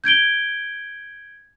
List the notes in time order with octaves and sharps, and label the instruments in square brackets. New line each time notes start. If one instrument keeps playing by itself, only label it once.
[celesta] G6 G#6 D7 G7